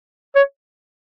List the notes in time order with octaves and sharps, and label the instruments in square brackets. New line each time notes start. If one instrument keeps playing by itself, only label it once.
[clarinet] C#5